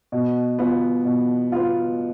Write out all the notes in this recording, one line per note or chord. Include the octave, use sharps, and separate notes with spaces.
B2
B3 F4
B2
B3 F4